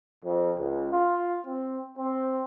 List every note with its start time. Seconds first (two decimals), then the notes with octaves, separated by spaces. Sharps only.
0.24 F2
0.58 C#2
0.92 F4
1.47 C4
1.97 C4